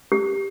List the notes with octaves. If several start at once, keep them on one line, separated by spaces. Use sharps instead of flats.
G4